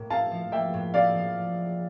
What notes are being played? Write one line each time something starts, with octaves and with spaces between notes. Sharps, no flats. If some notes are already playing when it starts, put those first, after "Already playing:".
Already playing: A2 A#3
E4 F5 A5
F3
A#3 E5 G5
A2
E4 D5 F5
F3